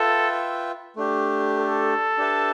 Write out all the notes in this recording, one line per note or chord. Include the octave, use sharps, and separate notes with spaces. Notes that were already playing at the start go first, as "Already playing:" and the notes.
Already playing: F4 A4 B4 E5 G5
A3 D4 G4
A4
D4 G4 B4 E5 A5